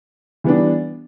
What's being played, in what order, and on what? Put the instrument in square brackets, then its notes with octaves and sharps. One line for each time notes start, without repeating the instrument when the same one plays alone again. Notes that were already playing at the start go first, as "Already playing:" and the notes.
[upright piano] E3 G3 B3 D4